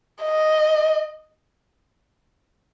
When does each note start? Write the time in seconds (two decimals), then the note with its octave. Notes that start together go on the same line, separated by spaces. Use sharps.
0.23 D#5